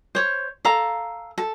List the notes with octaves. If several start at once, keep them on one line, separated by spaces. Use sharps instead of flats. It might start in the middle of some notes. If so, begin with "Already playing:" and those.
C5 C#5
A4 F5 A#5
A4